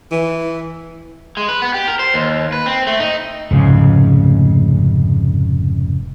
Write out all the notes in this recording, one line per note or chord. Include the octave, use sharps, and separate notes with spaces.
E3
G#3
B4
B3
G4
A#4
C5
D#2
B4
C4
A3
D#4
F1 C#2 G#2 C#3